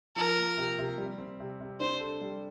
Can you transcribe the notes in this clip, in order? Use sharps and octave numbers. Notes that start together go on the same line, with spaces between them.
F3 A#4
A#3
C3
C3
G3
C4
C3
C3
D4 C5
A4
G3